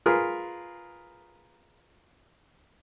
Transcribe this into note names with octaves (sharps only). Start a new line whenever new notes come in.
F4 G#4 A#4 B4